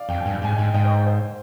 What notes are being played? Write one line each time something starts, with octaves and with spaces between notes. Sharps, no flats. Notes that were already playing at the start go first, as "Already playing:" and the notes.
Already playing: D5 F5
F2 G5
G2 G#5
G5
G#2 G#5
G#2 D#5 G5
G#2 D#5 G5
C5 D#5
C5